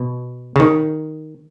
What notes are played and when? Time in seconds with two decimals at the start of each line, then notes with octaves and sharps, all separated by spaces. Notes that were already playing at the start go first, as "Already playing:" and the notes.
Already playing: B2
0.56 C#3
0.60 D#3